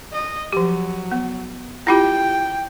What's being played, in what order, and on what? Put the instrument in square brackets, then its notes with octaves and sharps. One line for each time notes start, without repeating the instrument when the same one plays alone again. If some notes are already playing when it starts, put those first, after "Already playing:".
[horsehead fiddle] D#5
[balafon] F3 G4 [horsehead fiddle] F#3
[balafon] B3
[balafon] E4 F4 G4 [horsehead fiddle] G5